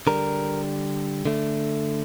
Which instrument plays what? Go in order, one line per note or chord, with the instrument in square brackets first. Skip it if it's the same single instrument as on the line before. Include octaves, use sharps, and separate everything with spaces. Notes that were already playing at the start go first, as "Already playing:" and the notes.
[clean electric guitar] D3 G3 A#4
D3 A3